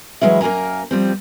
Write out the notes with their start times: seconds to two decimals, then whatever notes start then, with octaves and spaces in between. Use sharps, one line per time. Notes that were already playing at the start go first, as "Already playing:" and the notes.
0.21 E3 F#3 G#3 C#4 E4
0.41 F#2 A#3 A#4 G#5 A#5
0.91 F3 G3 C4